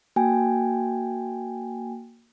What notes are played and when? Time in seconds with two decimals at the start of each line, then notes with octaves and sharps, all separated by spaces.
0.16 A#3 F#4 G5 G#5